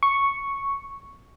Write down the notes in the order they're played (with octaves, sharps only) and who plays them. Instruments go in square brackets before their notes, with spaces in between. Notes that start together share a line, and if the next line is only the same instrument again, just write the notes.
[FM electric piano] C#6